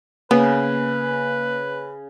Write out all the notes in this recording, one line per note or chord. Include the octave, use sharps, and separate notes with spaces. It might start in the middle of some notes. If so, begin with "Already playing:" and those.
C#3 A#3 B3 B4